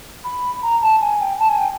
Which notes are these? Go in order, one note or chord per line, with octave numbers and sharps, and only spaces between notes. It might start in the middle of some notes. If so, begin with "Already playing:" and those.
B5
A#5
A5
G#5
G5
A5
G#5
G5